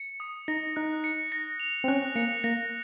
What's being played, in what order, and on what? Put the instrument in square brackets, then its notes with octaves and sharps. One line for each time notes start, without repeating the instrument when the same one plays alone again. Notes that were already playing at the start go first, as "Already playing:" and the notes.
Already playing: [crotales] C#7
D#6
[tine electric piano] D#4 [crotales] A#6
[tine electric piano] D#4 [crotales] F#6
[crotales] C#7
A#6
F7
[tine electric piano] C4
[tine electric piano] C#4 [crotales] F#6
[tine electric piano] A#3 [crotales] C#7
[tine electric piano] A#3 [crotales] A#6